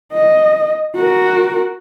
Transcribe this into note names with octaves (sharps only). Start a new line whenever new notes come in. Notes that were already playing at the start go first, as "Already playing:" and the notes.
D#5
F#4 A#4